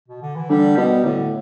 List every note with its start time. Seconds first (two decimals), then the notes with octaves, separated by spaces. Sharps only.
0.08 B2
0.22 D3
0.36 E3
0.50 D3 G3
0.77 B2 G3
1.05 A2 D3